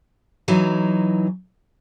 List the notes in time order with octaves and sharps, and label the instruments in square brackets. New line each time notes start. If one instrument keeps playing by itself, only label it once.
[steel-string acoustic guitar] E3 F#3 D#4